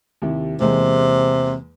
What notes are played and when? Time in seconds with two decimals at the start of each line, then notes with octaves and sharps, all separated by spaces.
0.22 D#2 C3 E4
0.61 E2 C3 G#3 A#3